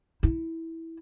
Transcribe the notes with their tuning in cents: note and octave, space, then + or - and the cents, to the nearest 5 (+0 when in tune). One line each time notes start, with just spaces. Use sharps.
E4 -10